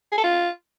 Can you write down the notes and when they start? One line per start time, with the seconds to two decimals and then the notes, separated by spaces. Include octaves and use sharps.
0.12 G#4
0.18 A4
0.24 F4